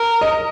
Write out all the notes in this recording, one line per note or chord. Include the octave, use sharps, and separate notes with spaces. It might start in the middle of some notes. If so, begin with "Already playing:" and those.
Already playing: A#4
D#5